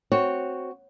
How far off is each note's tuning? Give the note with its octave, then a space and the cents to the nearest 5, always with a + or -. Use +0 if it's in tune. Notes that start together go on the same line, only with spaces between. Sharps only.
C4 +0 F#4 +0 C#5 +0